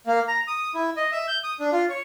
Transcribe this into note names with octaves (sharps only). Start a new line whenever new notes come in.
A#3
A#5
D#6
E4
D#5
E5
G6
D#6
D4
F4
C#5